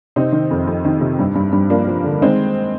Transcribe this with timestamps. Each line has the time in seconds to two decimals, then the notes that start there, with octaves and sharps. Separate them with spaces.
0.16 C3 C4 D#4
0.32 D#3
0.51 F2
0.67 F2
0.85 D#3
1.01 C3
1.19 G2
1.35 G2
1.53 G2
1.70 F3 A#3 D4
1.88 F3
2.04 D3
2.21 D#3 G#3 C4